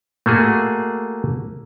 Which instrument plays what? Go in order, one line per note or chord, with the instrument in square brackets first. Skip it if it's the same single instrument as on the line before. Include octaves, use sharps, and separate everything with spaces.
[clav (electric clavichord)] A3 A#3 F#4 G#4